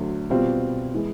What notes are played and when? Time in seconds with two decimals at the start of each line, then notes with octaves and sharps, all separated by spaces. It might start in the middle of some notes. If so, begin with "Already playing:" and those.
Already playing: D2 D3 F#3
0.30 B2 G3 C4 F4
0.94 E3 G#3